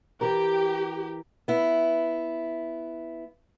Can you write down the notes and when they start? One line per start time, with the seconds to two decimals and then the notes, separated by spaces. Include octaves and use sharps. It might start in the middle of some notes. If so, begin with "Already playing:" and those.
0.21 E3 G4 A#4
1.48 B3 E4